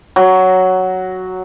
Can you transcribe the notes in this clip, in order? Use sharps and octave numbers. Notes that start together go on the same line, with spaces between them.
F#3